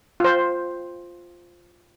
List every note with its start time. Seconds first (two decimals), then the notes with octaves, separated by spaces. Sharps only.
0.20 F4 C5